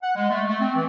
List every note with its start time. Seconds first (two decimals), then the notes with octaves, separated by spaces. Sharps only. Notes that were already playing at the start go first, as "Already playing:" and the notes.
0.02 F#5
0.15 G#3
0.30 A3
0.48 A3
0.60 C4
0.75 E3